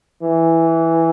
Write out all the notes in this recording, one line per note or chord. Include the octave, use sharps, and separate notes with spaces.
E3